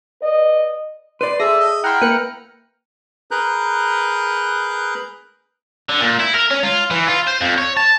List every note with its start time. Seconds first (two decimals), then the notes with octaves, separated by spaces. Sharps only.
0.22 B4 D5 D#5
1.21 B4 D5 C6
1.40 G#4 A4 D5 E5 A#6
1.60 D#5
1.84 E4 F#5 G5 A#5 C6 F6
2.01 A#3 B4 F#6 C#7
3.31 G#4 A#4 B4 A#5 F#6 G6
5.89 D3
6.01 A#2
6.19 E4
6.34 A#4
6.50 C#4
6.63 F4
6.91 E3
7.08 F4
7.27 C5
7.41 F2
7.58 C#5
7.77 A5